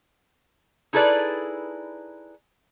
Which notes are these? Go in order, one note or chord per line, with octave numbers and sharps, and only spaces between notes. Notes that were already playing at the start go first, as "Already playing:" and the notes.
D#4 E4 G#4 A4 B4 D5